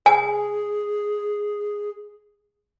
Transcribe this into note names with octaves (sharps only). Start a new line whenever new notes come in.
G#4 G#5